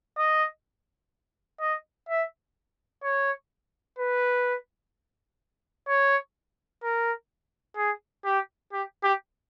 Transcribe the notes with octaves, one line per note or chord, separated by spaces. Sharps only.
D#5
D#5
E5
C#5
B4
C#5
A#4
G#4
G4
G4
G4